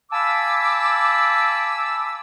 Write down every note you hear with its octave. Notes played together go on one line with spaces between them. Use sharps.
F5 G#5 A5 B5 D6 E6